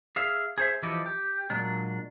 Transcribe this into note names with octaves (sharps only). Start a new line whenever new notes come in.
G#4 E5 F5
G#4 C5 E5
E3 F3 E4 G4 A4 D#5
G4
A#2 F#3 G#3 D4